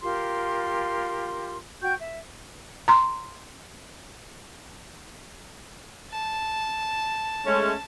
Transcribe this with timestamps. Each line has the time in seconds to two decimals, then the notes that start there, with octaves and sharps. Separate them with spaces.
0.03 F4 G4 A#4 C6
1.82 F#4 G5 C#6 G6
1.99 E5
2.88 A#5 C6
6.11 A5
7.46 G#3 A3 C#4